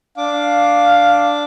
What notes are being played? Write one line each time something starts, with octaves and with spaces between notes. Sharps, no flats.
D4 F5 D6